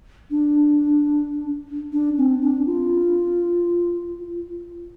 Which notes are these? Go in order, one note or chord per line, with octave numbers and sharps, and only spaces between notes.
D4
D4
C4
D4
F4